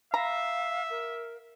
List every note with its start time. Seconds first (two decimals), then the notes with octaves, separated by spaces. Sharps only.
0.14 E5 F5 A#5
0.90 A#4